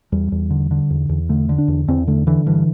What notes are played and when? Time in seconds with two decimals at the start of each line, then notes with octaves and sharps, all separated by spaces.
0.12 E2 G3
0.32 E2
0.50 D3
0.71 D3
0.90 E2
1.09 E2
1.29 D3 A3
1.49 D3
1.58 D4
1.68 E2
1.88 E2 C4
2.07 D3 A3
2.27 D3 E3
2.46 G2 E3